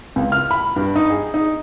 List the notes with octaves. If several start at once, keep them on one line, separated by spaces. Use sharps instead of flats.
C#2
F6
B5
G2
D#4
G#4
D#4